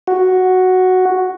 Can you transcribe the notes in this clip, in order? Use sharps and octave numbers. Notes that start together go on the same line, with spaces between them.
F#4